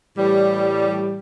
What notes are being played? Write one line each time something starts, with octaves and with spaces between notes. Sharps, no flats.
A2 E3 G3